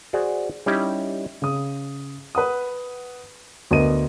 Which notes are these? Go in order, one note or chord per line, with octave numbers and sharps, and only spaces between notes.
F#4 G#4 C5 D5
G3 C#4 D#4 E4 G4
C#3 D#6
B4 F#5 D#6
D2 B3 A#4 D#5 D#7